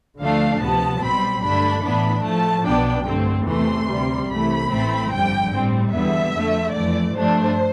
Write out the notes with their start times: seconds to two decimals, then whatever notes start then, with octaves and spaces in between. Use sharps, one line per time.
0.20 D2 D3 F3 A3 D4 F5
0.61 D2 C3 F3 B3 A5
1.02 B1 B2 G3 C4 B5
1.43 G2 D3 A3 D4 B5
1.83 A2 E3 B3 D4 B5
2.24 A2 F3 A3 A5
2.65 B1 B2 B3 D4 G5
3.06 G2 D3 A3 C4
3.47 E2 C3 E3 A3 C6
3.87 D2 C3 G3
4.28 C2 C3 E3 A3 B5
4.69 A1 A2 E3 A3 C4
5.10 G1 F2 D3 G3 G5
5.50 A2 G3 C4
5.91 E2 D3 G3 B3 E5
6.32 F2 D3 F3 A3
6.73 F2 E3 A3 D5
7.14 G2 F3 A3 D4 C5